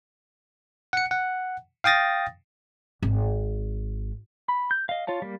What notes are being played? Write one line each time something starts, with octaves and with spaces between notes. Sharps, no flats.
F#5 C#7
F#5
F5 G5 D#6 A6 A#6
G#1
B5
G6
D#5 F5
F4 C#5 F5 A5
G3 A#3